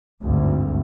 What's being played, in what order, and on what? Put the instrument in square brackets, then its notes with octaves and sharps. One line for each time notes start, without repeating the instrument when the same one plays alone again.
[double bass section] G#1 D2 G2